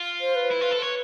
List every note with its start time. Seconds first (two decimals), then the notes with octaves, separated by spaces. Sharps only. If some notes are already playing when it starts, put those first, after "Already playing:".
Already playing: F4
0.20 C5
0.35 B4
0.51 E4
0.61 F4
0.71 A4
0.82 B4 C#5